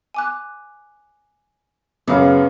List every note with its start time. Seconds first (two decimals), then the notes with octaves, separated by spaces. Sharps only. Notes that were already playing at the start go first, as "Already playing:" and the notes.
0.14 G#5 D6 F#6
2.08 F#2 C#3 B3 G#4 F5 D6